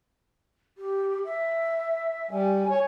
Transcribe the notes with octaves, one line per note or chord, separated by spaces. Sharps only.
G4
E5
G3 G#5
C#5